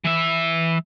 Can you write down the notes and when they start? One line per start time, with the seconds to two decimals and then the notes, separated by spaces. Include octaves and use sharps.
0.05 E3 E5